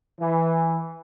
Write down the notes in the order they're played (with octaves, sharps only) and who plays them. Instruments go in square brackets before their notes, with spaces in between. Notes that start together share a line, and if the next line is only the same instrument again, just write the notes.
[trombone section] E3